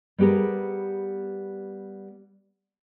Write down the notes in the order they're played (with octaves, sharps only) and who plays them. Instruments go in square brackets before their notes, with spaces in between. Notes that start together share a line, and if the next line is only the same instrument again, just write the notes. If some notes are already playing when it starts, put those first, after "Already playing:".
[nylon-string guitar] G3 B3 G4 G#4 A#4